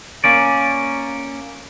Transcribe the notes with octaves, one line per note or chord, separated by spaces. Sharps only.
A#3 C#4 D5